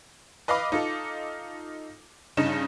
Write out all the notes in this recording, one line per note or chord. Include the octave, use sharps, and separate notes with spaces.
B4 D#5 F5 B5 D6
D#4 F4 A4
G2 C#3 D#4 E7